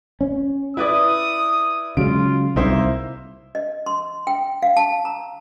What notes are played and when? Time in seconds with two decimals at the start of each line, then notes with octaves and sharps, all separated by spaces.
0.21 C#4
0.77 E4 B4 D5 D#6
1.97 C#3 F#3 G#3 F4 D7
2.56 C2 A#3 D#4 E4 C5
3.55 D#5
3.86 C6
4.27 G5
4.62 F5
4.77 A5
5.05 A#5